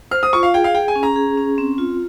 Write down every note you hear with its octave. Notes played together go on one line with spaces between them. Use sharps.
C5 F6
D#6
F4 C#6
F5
G#4 G5
F5
G#4 G5
G#5
C#4
A#5
G#4
C#4
C4
F4